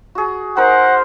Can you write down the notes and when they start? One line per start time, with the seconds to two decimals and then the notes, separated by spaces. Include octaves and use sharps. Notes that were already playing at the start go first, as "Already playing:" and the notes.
0.15 F#4 G#4
0.57 G#3 D#4 A#4 C5 F#5